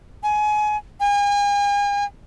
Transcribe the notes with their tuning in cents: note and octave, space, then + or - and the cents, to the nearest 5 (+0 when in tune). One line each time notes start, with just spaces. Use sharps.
G#5 +25
G#5 -40